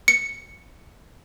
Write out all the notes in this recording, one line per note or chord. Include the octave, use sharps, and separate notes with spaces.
C#7